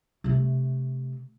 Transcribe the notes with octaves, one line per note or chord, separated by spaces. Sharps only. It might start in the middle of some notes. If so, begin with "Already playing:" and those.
C3 A3